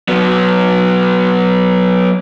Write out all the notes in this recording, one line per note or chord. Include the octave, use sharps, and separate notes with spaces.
F#3 B3